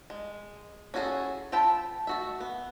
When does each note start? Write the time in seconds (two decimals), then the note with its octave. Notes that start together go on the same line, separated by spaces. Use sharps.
0.10 G#3
0.94 C#4 E4 F#4 G#4 A4
1.52 F4 A4 G5 A5 B5
2.07 A3 F#4 E5
2.40 B3